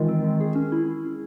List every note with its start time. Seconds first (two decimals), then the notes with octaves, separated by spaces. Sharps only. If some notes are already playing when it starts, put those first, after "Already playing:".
Already playing: D#3 E3 G#3 F4
0.08 C4
0.24 G#3
0.40 G#4
0.55 C#4
0.72 E4